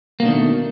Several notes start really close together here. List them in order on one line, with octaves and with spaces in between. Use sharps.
A#3 B2 D4 D#3 A3